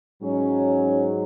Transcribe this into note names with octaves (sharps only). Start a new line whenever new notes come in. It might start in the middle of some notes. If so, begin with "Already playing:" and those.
G#2 F#3 C#4